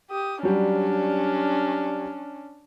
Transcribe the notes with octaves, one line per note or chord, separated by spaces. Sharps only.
G4 D#6
F#3 G3 C#4 D4